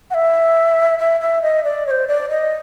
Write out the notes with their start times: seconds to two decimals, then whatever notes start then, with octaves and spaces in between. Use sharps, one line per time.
0.11 F#5
0.14 E5
0.99 E5
1.21 E5
1.42 D#5
1.64 D5
1.87 C#5
1.91 C5
2.08 D5
2.30 D#5